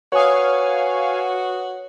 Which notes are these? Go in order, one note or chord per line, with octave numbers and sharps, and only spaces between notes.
F#4 B4 C#5 F5 G#5 C#6 D#6